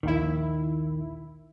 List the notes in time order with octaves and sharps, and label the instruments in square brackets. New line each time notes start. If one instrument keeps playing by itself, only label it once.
[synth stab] A#1 D#2 E4 [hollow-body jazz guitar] D#3